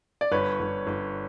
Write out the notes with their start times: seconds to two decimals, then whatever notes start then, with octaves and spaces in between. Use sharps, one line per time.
0.21 D5
0.32 G1 B4 C#5
0.60 G1
0.87 G1